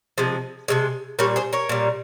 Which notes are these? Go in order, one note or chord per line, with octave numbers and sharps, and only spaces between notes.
C3 F3 G#3
C3 F3 G#3
A#2 G3 A#4 C#5
G#4 C5
A#4 C#5
A#2 G3